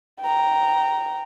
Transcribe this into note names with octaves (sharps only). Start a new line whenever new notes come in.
G5 A#5